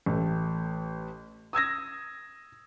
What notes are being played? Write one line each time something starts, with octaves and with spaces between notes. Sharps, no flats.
A1 A3
D#6 E6 G#6 A#6